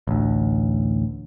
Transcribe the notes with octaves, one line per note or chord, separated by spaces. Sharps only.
A1 D2